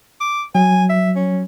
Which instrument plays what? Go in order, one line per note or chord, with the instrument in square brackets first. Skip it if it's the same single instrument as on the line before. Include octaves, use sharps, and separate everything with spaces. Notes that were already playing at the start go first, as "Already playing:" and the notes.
[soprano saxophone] D6
[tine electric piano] F#3 [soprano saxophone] G#5
[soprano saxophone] E5
C#4